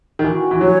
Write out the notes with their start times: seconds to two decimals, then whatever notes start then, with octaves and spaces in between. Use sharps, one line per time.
0.19 D#3
0.24 E3 F#4
0.51 E3
0.61 F#3 C#5